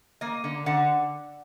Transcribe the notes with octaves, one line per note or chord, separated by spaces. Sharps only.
A#3 D#5
D3
D3 F#5